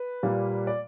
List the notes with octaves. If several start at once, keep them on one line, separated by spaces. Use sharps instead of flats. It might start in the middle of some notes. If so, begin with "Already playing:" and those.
Already playing: B4
A#2 G3 A#3
D5